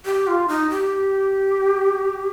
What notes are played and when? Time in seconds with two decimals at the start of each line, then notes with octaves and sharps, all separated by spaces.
0.05 G4
0.27 F4
0.48 D#4
0.70 G4